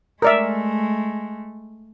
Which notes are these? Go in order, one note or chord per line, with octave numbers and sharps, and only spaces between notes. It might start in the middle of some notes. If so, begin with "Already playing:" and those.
G#3 A3 A#4 D5 E5